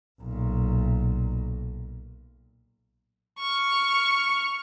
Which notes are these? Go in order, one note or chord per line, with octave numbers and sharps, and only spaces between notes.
B1 A#2
C#6 F6